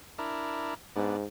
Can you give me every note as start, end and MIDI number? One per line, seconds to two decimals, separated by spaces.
0.18 0.74 62
0.18 0.74 64
0.18 0.74 70
0.96 1.25 44
0.96 1.17 59
0.96 1.17 62